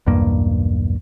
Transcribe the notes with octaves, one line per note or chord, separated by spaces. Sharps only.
B1 E2 G2 A#3